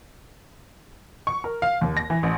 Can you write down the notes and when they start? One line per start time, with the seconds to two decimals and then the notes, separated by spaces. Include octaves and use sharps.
1.27 C#6
1.44 A#4
1.62 F5
1.81 D#2
1.97 A#6
2.10 E3
2.23 A1